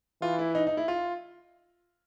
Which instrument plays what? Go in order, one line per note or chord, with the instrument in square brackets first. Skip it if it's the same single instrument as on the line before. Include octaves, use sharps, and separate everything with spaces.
[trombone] E3 [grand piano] F4
[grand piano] E4
D#4
D#4
E4
F4